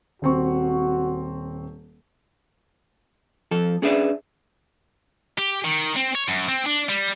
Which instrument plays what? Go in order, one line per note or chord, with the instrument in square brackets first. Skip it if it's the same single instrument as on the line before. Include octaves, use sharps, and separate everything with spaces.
[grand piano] D#1 C4 C#6 [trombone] F#4
[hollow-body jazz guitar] F2 F3 A4
C#4 D4 G#4 B4 D5 E5
[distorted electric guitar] G4
D#3
C4
C#5
F#2
C4
D4
G3